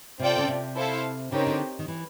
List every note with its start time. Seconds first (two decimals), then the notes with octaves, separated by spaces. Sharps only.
0.20 C3 C4 F4 A4 D5 G5
0.38 C#3
0.48 C3
0.76 E4 A4 C5 F5
1.32 C#3 C4 D#4 G4 A#4 C#5
1.47 D3
1.79 D#3
1.88 E3